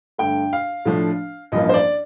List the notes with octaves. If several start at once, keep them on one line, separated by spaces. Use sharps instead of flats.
G2 D3 A3 G5
F5
A2 F3 A3 D4
A1 G2 F3 A#3 D#5
C5
D5